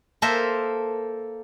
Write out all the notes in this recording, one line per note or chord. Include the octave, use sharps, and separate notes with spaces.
A#3 A4 A#4 C5 E5